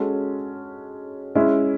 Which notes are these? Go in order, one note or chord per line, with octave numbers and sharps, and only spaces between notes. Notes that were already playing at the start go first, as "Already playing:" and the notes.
Already playing: G#3 C#4 F#4 A4
G#3 C#4 E4